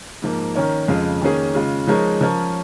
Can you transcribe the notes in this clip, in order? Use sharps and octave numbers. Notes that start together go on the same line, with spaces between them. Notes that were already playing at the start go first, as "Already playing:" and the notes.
G#2 F3 A#3
D#3 C#4 A#4 C#5
F2 C#3 G#3 F4
D#3 A#3 C#4 G#4
C#3 G#3 F4
F3 G#3 D#4 A#4 C#5
F3 C#4 A#4 C#5